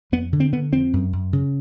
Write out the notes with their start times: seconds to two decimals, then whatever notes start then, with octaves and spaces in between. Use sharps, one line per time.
0.12 F2 B3
0.33 D3
0.40 C4
0.53 D3 B3
0.73 F2 C4
0.93 F#2
1.13 F#2
1.33 C#3